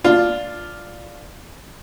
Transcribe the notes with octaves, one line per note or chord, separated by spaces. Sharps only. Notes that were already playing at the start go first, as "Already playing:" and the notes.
D4 F4